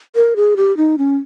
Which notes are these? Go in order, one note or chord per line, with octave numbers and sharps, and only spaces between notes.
A#4
G#4
G4
D#4
C#4